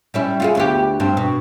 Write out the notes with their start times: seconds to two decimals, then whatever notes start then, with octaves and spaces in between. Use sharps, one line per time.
0.14 G3 C#4 E4
0.40 F4 F#4 G#4
0.55 D2 B3 G4
1.00 G2 C4
1.17 B2